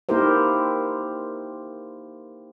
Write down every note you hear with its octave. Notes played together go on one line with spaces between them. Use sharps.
A#3 D#4 E4 G4 A#4 C5